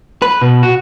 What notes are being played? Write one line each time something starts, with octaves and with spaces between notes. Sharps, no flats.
B4
B2
F#4